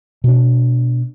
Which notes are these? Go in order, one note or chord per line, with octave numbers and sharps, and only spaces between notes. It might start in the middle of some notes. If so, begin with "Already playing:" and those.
B2 D4